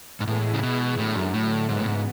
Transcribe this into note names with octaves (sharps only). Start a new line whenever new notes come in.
G#2
A2 E3 G#3 B3 E4 G#4
C#3
B2
A2 D3 F#3 A3
F#2
A2
G#2 C#3 E3 B3
A2
G#2